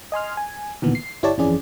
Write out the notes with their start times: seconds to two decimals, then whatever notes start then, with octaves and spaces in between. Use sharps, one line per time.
0.12 D#5 G#5 C6 F6
0.37 G#5
0.82 D2 A#2 D#3 E3 B3
0.95 C7
1.23 G1 E4 G4 C#5 D5 A5
1.37 G1 F2 E3 C#4 G#4 D5